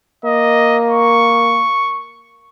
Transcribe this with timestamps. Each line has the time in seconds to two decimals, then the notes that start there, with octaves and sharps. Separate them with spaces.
0.25 A#3 D#5
0.90 C#6